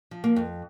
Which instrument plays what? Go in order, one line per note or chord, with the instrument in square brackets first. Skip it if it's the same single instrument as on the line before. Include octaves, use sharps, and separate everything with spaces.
[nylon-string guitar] F3
A#3
F2